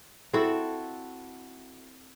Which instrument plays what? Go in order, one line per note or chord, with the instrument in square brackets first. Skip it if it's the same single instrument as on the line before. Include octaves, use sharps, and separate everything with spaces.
[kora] C4 E4 F#4 A4